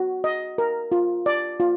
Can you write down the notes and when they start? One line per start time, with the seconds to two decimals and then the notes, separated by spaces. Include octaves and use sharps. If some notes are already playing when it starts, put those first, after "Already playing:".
Already playing: F#4
0.24 D#5
0.58 A#4
0.92 F4
1.26 D5
1.60 F4